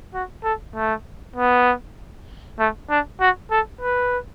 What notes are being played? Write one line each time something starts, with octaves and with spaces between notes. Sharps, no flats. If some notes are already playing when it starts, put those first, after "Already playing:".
F#4
A4
A3
B3
A3
D4
F#4
A4
B4